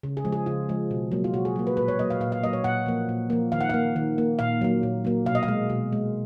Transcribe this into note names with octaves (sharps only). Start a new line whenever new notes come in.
C#3
G#4
F3 G#3
G#4
C#3 F4
F3 G#3
B2
F#3 A#3
F4
B2 F#4
G#4
F#3 A#3
B4
A#2 B4
C#5
F#3 A#3 D#5
F5
A#2 F5
F5
F#3 A#3 D#5
C#5
A#2 F#5
F3 A#3
A#2
F3 A#3
D#3 F5
F#5
A#3 F5
D#3
A#3
A#2 F5
F#3 A#3
A#2
F#3 A#3
B2 F5
D#5
F5
G#3
B2
G#3